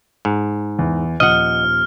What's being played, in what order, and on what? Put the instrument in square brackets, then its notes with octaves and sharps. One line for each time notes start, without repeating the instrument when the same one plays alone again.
[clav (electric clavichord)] G#2
[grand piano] E2
[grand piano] D#1 F3 [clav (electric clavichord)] D#5 F#5 [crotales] F6